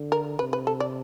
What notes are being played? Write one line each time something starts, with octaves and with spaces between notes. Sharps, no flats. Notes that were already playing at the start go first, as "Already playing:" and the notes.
Already playing: D3
A#4
C3 B4
B4
A4
D5